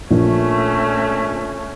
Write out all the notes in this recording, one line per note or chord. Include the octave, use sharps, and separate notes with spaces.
A#1 A3 C#4